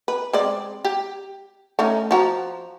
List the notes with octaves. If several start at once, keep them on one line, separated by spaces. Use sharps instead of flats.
B4
G#3 C4 D5
G4
A3 C#4 D#4
F3 F#4 A#5